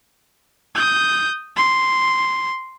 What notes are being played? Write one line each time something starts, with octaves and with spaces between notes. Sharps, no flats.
D#6 G6
C6